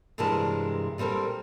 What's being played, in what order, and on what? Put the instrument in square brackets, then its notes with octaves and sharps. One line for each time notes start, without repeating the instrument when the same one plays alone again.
[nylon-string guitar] G2 C3 E3 G#3 A#4 A5
A#2 G3 C4 A4 A#4